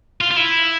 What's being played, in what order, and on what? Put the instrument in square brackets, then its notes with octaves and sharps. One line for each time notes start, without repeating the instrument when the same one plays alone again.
[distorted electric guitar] F4
F4
E4